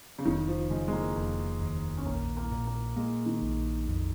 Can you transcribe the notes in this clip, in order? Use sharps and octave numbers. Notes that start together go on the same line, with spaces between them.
C#3
F1 D#3
F3
C#3 G#3
G#3
A#3
F1 A#3
D#2
C#4
A#1 A#3
A#3
A#2
A#3
G#3 A#3
D#3
A#1
F2